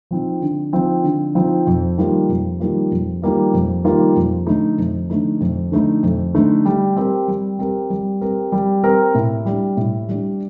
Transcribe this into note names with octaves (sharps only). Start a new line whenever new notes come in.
F3 C4 D#4
D3
F3 C4 D#4
D3
F3 C4 D#4
F2
D#3 G3 A#3 F4
F2
D#3 G3 A#3 F4
F2
D#3 G3 A#3 F4
F2
D#3 G3 A#3 F4
F2
D3 A3 D#4
F2
D3 A3 D#4
F2
D3 A3 D#4
F2
D3 A3 D#4
G3
C4 G4 A#4
G3
C4 G4 A#4
G3
C4 G4 A#4
G3
C4 G4 A#4
A2
G3 D4
A2
G3 D4